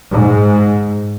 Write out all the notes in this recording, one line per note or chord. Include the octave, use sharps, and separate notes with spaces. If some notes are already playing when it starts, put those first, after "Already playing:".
G#2